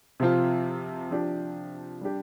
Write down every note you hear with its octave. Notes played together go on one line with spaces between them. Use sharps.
C3 F3 C4 F4
F3 D4 G4
G3 D4 G4